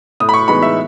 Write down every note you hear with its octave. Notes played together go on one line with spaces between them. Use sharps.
A2 D#6
B5
C#6
E3 G#3 B3 D#4 B5
E5